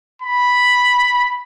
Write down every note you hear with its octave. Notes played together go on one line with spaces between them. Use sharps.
B5